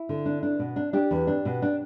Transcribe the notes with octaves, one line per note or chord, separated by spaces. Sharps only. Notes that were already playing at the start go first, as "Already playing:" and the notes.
Already playing: E4
D3
D4
D4
B2
D4
D4 G4
E2
D4
B2
D4